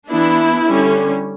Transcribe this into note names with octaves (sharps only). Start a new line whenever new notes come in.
E3 B3 D4 E4
D3 G3 C#4